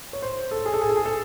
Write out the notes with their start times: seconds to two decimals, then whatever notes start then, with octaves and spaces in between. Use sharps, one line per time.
0.13 C#5
0.22 C5
0.51 A4
0.66 G#4
0.74 A4
0.82 G#4
0.89 A4
0.97 G#4
1.05 A4